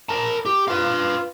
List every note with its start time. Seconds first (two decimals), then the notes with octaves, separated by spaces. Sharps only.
0.09 A#4 A5
0.46 G4
0.68 F4 B4 F5